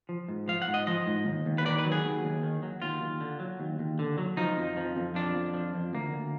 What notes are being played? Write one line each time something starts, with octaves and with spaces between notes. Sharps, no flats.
F3
G#2
F3 F5
F#5
G#2
D#5
F3 D#5
G#2
D#2
D#2
B4
D#3 D5
B4
F#3
G#4
D#2
D#2
D#3
F#3
D#2 F4
D#2
D3
F#3
D#2
D#2
D3
F#3
F3 D#4
F2
F3
F2
F3 D4
F2
F3
F2
D2 A#3
D2